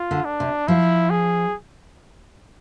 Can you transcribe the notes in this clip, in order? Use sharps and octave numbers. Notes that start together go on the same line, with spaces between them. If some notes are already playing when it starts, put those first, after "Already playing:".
Already playing: F4
D3
D4
C3
F3 E4
G#4